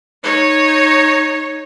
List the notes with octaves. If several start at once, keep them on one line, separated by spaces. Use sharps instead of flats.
D#4 C#5